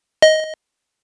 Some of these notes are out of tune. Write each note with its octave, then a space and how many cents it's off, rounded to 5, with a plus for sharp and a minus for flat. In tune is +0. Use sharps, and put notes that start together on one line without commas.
D#5 +10